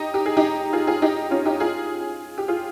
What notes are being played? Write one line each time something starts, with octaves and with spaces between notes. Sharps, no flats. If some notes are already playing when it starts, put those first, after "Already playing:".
Already playing: D#4 G4
G4
G#4
D#4 G4
F4 G#4
F4 G#4
D#4 G4
C#4 F4
D#4 G4
F4 G#4
G4
F4 G#4